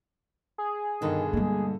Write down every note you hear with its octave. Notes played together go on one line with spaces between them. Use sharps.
G#4
G2 B2 D3 D#3
G3 G#3 A#3